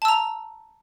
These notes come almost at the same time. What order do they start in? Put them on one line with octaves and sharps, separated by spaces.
A5 E6 A#5